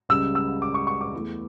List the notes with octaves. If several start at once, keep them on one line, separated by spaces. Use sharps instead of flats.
C#2 C#3 G3 E6
E6
D6
C#6
C#6
D6
E2 E3 A3